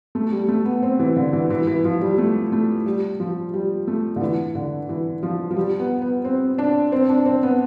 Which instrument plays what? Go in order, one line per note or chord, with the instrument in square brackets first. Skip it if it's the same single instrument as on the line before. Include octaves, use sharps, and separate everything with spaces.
[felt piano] A3
G3
A3
B3
C4
E3
D3
E3
E3
E3
F3
G3
A3
A3
G3
F3
G3
A3
D3
E3
D3
E3
F3
F3
G3
B3
B3
C4
D4
C4
D4
C4
B3